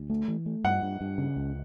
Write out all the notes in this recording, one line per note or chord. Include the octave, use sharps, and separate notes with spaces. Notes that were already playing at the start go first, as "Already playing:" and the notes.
Already playing: D2
A3
E3
A3
G2 F#5
G2
G2
C#3
C#2